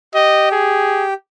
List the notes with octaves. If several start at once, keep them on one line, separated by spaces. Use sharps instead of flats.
G4 D#5
G#4